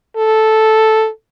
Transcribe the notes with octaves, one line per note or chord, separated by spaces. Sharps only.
A4